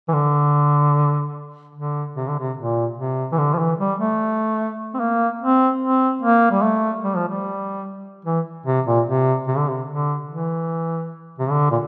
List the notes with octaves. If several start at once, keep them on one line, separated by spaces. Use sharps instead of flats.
E3
D3
D3
C3
D3
C3
A#2
C3
E3
D3
F3
E3
G3
A3
C4
A#3
C4
C4
A#3
G3
A3
G3
F3
G3
E3
C3
A#2
C3
C3
D3
C3
D3
E3
C3
D3
A#2